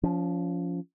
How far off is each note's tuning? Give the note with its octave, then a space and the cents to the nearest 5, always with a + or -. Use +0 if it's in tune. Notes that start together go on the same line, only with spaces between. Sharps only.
F3 +0 C#4 +35